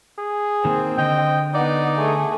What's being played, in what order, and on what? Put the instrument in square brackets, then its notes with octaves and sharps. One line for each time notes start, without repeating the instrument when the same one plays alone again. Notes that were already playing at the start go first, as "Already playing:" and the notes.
[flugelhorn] G#4
[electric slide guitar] D#3 A#3 [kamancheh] C4
[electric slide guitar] D3 [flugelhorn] D#5 [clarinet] G5
[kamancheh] B3 F#5 [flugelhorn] D#4 [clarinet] D5
[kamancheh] A3 G#4